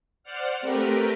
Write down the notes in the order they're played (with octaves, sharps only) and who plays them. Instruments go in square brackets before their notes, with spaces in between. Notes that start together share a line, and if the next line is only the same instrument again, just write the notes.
[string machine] C5 D5 F#5 F6
A3 C4 G4 A#4 B4